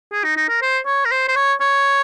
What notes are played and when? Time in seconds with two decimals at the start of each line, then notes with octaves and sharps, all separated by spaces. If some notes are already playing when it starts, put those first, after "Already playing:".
0.12 G#4
0.24 D#4
0.37 D#4
0.49 A#4
0.62 C5
0.86 C#5
1.05 A#4
1.11 C5
1.28 C5
1.36 C#5
1.61 C#5